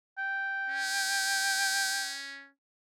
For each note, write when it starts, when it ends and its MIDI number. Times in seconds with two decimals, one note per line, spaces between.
0.18 2.14 79
0.70 2.49 61